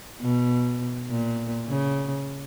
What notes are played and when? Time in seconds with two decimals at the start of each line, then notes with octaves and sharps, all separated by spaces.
0.21 B2
1.09 A#2
1.69 C#3